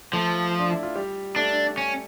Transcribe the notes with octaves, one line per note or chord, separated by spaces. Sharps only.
F3 A3 A4
D4
E4
F4
G3 G4
A3 D4 A4
C#4